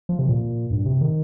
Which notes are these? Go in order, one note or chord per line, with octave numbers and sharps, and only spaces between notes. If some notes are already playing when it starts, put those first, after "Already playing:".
F3
C3
A#2
G2
C3
D#3